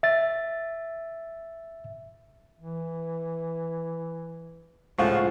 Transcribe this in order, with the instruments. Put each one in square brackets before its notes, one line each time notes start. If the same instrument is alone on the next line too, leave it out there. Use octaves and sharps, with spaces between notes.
[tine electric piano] E5 A6
[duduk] E3
[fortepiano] C#2 A2 [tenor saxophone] F3 [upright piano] F5 F#5 C#6